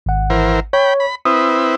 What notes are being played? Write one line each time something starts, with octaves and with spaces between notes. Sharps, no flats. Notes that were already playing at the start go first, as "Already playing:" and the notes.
G#1 F#5
E3 A#4 C5
C#5 G5 B5
B5
C4 E4 B4 D#6